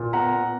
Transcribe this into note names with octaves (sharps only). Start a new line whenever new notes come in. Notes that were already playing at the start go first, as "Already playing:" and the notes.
Already playing: A#2
B3 F#5 A#5
B3